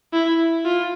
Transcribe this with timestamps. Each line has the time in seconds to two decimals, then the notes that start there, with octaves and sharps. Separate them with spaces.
0.13 E4
0.65 F4